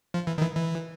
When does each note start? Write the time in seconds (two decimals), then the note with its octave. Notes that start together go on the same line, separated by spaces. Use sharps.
0.14 F3
0.27 E3
0.38 D#3
0.41 E3
0.57 E3